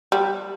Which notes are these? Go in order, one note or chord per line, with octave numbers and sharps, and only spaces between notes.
G3